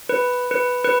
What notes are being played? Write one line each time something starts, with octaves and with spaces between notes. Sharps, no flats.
B4
B4
B4